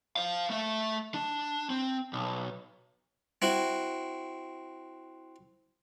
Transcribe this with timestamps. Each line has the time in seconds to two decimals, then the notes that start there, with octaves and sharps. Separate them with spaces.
0.16 C5 F5
0.50 A3 E5
1.14 D4
1.70 C4
2.13 B1
3.42 C4 E4 F#4